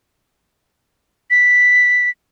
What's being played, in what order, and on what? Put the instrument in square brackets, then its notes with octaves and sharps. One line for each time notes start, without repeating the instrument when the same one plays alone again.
[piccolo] B6